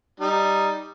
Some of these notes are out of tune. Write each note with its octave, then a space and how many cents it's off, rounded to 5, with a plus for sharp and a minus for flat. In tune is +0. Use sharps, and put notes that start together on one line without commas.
G3 +0 D#4 +0